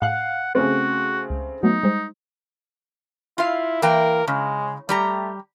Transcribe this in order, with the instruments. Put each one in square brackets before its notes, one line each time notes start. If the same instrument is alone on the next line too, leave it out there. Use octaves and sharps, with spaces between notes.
[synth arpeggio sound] A2 F#6 [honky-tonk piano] F5 [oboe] F#5
[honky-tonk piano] C#3 A3 C4 [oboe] F#4
[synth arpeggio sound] C#2
[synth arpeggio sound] F#3 A3 B3 [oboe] D#4
[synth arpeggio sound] G3 G#3 C5
[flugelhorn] E4 [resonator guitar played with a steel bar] F4 F5
[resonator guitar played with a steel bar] E3 A#3 G5 [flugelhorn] A#4
[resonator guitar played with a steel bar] C#3 [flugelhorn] G#3
[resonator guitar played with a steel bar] G3 G4 A#5 [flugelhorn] A3